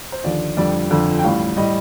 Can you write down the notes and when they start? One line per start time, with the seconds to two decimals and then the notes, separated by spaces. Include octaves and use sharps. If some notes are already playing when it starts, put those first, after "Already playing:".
0.12 C5
0.24 D#2 D3 F3 D5
0.57 F2 D3 G3 D5
0.90 G1 F2 D3
1.19 G5
1.23 A1 A2 G3 F5
1.57 A2 G3 D#5